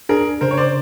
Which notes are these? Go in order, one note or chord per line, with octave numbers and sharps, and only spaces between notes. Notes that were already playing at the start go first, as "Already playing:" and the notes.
D4 G#4 A#4
C#3 A#4 C5
C#5
C5 D5